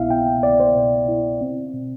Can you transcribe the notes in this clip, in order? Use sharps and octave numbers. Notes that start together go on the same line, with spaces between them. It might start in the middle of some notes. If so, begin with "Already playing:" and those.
Already playing: C2 B2 B3 E4 E5 F5
B3 G5
C2 D5
C5
B2
E4
C4
B2